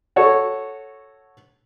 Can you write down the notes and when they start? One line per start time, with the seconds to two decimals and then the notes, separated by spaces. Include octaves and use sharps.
0.16 F#4 A4 C#5 C#6